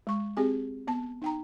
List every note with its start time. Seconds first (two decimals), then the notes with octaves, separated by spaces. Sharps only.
0.07 G#3 C#6
0.37 C4 G4 G#4 G#5
0.87 B3 A5
1.22 D#4 G5 A#5